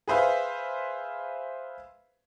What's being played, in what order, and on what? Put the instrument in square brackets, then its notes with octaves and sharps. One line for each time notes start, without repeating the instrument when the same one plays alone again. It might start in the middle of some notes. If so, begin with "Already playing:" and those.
[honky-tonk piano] G#4 B4 C5 E5 F5